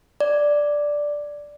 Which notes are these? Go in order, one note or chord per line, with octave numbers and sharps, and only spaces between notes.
D5